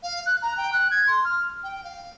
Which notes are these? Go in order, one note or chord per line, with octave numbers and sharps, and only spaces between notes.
F5
F#6
A#5
G5
F#6
G#6
C6
F6
G5
F5